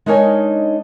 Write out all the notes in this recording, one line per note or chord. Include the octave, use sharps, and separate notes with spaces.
G#3 D4 D#4 A#4 C#5 G#5